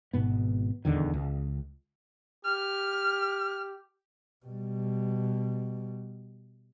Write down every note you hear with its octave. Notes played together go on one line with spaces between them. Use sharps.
G#1 G#2 B2 B3
D#1 E2 D3 D#3
C#2
G4 F6
B2 G3